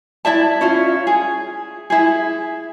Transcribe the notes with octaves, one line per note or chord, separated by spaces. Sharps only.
E4 D5 E5 A5
C#4 E4 F4
G#4
E4 G#4